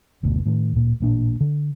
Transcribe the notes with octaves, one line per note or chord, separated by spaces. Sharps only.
F#1 D2 B2
A2 D#3
D1 A#2
A1 A#2 D4
D3